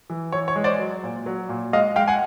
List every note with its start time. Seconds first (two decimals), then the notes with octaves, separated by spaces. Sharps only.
0.10 E3
0.32 E3 C#5
0.48 C#5
0.56 G#3
0.64 C5 D5
0.79 F#3
1.03 A#2
1.26 F#3
1.49 A#2
1.73 G#3 D#5 F5
1.96 G#3 F5 G5
2.08 F#5 G#5